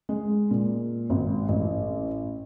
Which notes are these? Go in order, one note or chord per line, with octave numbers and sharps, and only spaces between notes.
G#3
A#2
G#1
A1